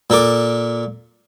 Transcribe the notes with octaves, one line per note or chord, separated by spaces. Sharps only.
A#2 A4 A#4 D6